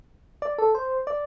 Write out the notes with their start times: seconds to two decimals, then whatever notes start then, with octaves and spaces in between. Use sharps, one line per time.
0.42 D5
0.58 A4
0.75 C5
1.07 D5